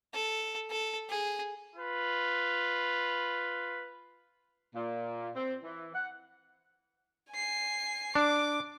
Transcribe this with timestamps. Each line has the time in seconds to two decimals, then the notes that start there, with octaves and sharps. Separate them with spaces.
0.14 A4
0.71 A4
1.10 G#4
1.76 F4 B4
4.76 A#2
5.36 C4
5.64 E3
5.95 F#5
7.31 G#5 C7
8.15 D4 D6